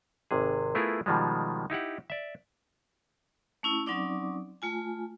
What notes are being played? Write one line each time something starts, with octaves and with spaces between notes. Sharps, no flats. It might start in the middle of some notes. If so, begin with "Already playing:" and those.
G#1 C3 G#4
A3 B3 E4 F4 G#4 A#4
B2 D#3 F3 G3 G#3
D#4 E4 G4 F#5
D5 E5
A3 C#4 E4
F#3 C4 C#4 D#4 D5 D6
A3 F4 G#5